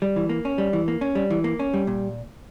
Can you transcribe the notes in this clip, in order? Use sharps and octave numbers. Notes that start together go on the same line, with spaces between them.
G3
E3
A#3
C#4
G3
E3
A#3
C#4
G3
E3
A#3
C#4
G3
A#2